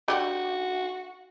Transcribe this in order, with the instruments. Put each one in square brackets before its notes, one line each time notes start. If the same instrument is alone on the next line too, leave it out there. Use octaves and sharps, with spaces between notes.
[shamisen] D3 G4 F#5 [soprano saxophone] F#4